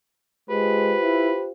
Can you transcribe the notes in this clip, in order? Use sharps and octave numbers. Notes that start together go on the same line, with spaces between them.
G#3 F4 G4 B4 C5
E4